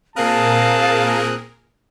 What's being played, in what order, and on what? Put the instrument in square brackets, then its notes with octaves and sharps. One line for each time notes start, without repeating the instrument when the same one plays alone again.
[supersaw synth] A#2 G#4 A#4 [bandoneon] C4 D#6 F#6 [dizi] F5 [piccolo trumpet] A5